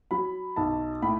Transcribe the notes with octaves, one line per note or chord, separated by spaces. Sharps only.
F#3 B5
B1 A5
A2 B5